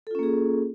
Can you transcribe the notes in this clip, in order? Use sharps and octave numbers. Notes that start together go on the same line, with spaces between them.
A#3 C#4 F4 G#4 A4